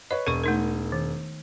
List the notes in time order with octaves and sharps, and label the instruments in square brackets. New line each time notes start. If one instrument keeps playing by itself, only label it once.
[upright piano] B4 C#5 [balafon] D#5
[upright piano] E1 D#7 [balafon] A#4 C#6
[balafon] A3 D#4 A#4
D#3